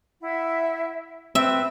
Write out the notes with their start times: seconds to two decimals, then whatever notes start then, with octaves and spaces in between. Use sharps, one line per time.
0.23 E4 E5 F#5
1.35 C4 B4 E5